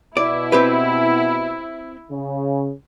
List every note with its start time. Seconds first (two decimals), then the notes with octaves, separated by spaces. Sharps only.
0.17 B2 E4 D5
0.52 C4 G4 B4
2.11 C#3